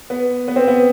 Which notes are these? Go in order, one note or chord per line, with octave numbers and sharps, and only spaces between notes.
B3
B3
C4
B3